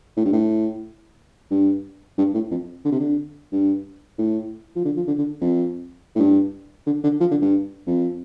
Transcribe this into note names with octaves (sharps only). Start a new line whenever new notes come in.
A2
G2
A2
G2
G2
A2
F2
D3
C3
D3
G2
A2
F3
D3
F3
D3
D3
F2
A2
G2
D3
D3
F3
D3
G2
F2